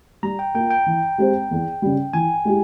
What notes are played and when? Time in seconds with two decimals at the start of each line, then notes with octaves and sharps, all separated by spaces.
0.23 G3 A#5
0.39 G5
0.54 A#3 F4 G5
0.70 G5
0.86 E3
1.18 G#3 C4 G4 C5
1.51 E2
1.82 C#3 G3
2.13 E3 G#5
2.45 G#3 E4 G4